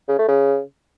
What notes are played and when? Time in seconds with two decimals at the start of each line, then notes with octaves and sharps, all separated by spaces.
0.09 C#3
0.18 A3
0.28 C#3